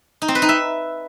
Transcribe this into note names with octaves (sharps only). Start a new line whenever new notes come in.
D#4
C4
B4
D#4
E5